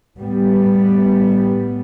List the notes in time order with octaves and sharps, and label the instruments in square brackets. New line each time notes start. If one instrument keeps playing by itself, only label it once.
[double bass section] A2 G3 B3